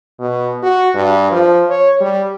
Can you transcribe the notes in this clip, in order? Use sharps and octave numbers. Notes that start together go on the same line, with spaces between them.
B2
F#4
G2
F3
C#5
G3